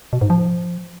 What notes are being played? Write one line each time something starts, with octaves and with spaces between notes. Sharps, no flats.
B2
G#2
F3